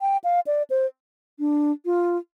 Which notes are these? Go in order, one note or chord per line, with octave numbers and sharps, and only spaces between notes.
G5
F5
D5
C5
D4
F4